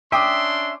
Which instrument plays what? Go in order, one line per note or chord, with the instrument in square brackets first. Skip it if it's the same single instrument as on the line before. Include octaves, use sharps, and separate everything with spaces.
[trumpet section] C#4 D4 C6 [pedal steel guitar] E5 [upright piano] G5 D6 D#6